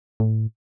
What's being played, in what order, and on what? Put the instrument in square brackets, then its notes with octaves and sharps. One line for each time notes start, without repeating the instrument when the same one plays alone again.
[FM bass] A2